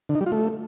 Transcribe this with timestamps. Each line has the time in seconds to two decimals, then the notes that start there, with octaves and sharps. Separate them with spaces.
0.09 D3
0.15 D#4
0.21 G3
0.26 F4
0.32 A3